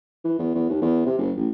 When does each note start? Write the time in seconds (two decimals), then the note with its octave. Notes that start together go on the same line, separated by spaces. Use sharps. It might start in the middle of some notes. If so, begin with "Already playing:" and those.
0.24 E3
0.39 E2
0.55 E2
0.69 D#2
0.81 E2
1.06 C3
1.18 F#1
1.37 A1